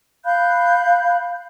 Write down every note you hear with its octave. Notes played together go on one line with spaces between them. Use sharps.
F5 B5 F#6 G6